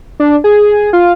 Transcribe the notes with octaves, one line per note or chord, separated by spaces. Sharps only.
D4
G#4
F4